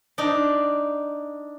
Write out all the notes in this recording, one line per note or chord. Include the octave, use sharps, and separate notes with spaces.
D4 D#4